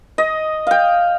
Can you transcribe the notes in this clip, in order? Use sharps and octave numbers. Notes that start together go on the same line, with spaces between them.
D#5
F5 G5